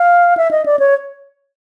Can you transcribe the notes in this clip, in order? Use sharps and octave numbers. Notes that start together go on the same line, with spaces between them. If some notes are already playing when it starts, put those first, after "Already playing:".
Already playing: F5
E5
D#5
D5
C#5